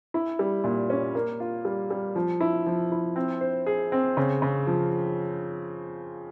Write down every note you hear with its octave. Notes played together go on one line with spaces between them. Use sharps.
E4
G3
A#2
C#4
A#3
F4
G3
G3
F3
E4
F3
E4
C4
C5
G#4
C4
C#3
C#3
F3